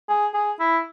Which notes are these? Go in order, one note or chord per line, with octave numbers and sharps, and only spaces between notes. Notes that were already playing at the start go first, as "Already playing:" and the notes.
G#4
G#4
E4